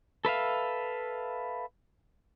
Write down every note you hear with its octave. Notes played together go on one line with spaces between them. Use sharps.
A4 B4 E5 F5